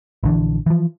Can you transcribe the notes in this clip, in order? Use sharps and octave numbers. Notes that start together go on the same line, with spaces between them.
A#1 D3 E3
E3 F3